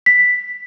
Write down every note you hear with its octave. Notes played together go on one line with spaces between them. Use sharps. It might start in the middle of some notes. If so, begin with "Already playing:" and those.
B6